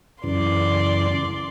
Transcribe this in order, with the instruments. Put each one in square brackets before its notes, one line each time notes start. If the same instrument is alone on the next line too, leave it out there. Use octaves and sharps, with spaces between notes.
[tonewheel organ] F#2 C#3 E3 [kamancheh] D5 C6